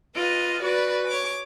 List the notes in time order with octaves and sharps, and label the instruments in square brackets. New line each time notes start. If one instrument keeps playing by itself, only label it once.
[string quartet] F4 B4 D#5
F#4 B4 D5
C#5 D6